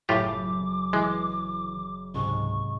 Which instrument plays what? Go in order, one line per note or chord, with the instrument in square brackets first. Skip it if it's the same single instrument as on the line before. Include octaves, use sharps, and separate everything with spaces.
[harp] F#1 [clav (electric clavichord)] A2 F4 G4 [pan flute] D6
[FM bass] E3 [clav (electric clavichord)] G#3
[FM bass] C#2 [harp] G#2 C3 [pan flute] C#6